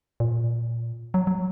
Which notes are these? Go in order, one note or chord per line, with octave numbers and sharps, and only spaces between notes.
A#2
F#3
F#3